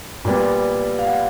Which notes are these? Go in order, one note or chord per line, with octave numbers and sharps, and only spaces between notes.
A#2 G3 B3
F5
F#5